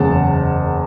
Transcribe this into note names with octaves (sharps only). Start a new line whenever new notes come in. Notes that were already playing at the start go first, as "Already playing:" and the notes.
Already playing: F#1 E2 C#3 G#3 F#5 A5